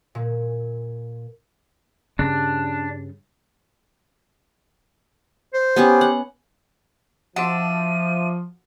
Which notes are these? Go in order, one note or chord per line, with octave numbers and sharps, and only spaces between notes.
A#2
G2 C#3 G3 D4
C5
B3 C#4 G4
F#5
F3 D4 F#4 E5 F#5 D#7